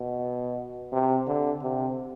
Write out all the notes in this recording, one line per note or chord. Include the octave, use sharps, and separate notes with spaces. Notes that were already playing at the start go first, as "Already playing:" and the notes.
Already playing: B2
C3
D3
C3